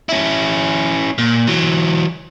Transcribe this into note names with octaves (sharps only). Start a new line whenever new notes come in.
C#4 E4
A#2
E3 F#3